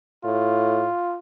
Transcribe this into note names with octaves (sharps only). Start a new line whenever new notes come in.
A2 F4